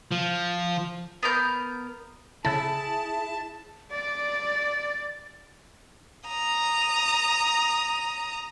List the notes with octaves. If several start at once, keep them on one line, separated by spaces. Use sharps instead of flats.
F3
B3 A#4 G6
C#3 E4 G#4 A4 A5
D5 A6
A#5 D#6